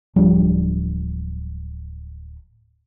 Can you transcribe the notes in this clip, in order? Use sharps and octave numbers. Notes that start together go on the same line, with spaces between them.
D1 F3 G3 D4